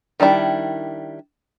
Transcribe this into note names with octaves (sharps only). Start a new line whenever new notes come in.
D#3 G3 D4 E4